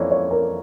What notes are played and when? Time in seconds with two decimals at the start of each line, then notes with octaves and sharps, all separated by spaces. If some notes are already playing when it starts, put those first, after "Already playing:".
Already playing: F2 E3 A#3 C#5 D5
0.11 C#5
0.31 A#4